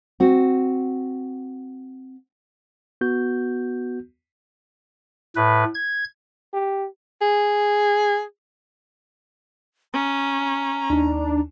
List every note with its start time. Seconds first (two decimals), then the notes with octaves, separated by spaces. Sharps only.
0.20 C4 F#4
3.01 B3 F#4 G6
5.36 A2 B4
5.74 G#6
6.54 G4
7.22 G#4
9.94 C#4 A#5
10.90 D#2 D4 D#4